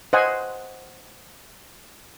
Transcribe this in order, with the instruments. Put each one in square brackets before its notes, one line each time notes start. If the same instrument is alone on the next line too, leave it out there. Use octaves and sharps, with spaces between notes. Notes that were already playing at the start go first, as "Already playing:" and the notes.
[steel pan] C5 D#5 F#5 G#5